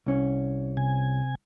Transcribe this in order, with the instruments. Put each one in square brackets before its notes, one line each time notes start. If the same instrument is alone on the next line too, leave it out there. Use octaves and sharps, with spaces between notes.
[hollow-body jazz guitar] C2 C#4
[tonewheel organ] C3 G#5